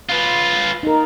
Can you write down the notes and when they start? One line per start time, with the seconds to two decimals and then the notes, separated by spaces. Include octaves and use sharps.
0.09 F4 B4
0.83 D#4 A#4